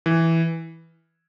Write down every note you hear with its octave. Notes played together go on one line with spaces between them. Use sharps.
E3